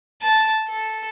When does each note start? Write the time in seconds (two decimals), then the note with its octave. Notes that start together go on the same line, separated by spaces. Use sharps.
0.21 A5
0.68 A4